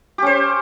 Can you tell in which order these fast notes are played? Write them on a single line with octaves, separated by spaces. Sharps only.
G4 C#4 C5